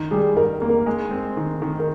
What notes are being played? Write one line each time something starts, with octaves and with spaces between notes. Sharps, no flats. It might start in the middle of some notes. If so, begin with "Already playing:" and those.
Already playing: D#3
G3 G#4
G#2 A#4
A#3
A#4
G#3
C4
D#3
D#3
A#4